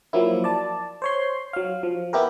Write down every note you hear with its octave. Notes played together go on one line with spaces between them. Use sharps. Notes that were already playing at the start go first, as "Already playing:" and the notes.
F3 F#3 A#3 E4
D5 A5
C5 C#5 C6
F#3 F5
F3
B3 E4 G4 A#4